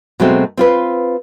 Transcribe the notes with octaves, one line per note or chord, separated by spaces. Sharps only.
B2 F#3 G#3 A3 C4
C4 F4 B4